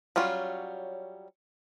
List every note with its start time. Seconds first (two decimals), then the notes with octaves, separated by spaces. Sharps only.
0.16 F#3 G3 C#4 F4